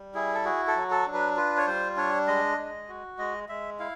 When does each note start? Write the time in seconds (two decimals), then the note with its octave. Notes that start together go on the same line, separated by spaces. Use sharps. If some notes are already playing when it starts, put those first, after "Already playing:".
Already playing: G3
0.14 E4 G#4
0.35 A4
0.45 F#4 G#4
0.68 A4
0.76 F#3
0.91 A4
1.06 D4
1.14 B4
1.37 F4 B4
1.57 C#5
1.67 G3 C5
1.96 D4 C#5
2.27 G#3 D#5
2.58 G#3
2.89 F#4
3.18 G#3 D#5
3.49 G#3 E5
3.79 E4 F5